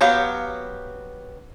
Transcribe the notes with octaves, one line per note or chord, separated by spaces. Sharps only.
F#3 B3 G4 F5